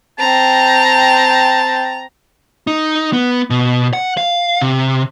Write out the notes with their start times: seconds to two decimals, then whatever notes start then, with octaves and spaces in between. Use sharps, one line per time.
0.19 C4 G5 A5 A#5
2.67 D#4
3.13 B3
3.50 B2
3.93 F#5
4.17 F5
4.61 C3